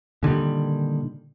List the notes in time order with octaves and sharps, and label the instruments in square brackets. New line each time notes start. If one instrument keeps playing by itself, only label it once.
[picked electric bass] A#2 D3 D#3 G3